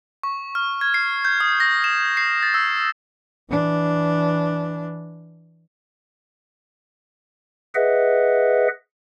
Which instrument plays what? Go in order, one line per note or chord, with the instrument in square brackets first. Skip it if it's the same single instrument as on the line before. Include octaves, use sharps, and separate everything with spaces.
[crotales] C#6
F6
G#6
C7
G6
D#6
A#6
E7
C7
A6
E6
[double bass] E3 D4
[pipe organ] G#4 B4 D#5 E5 F#5